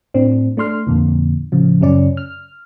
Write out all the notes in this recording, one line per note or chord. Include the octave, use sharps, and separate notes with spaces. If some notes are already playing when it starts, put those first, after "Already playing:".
A2 C4 D4
A3 D4 C6 F6
F2 A#2 D3
A2 C#3 F3
F#2 C#3 C#4 D5
F6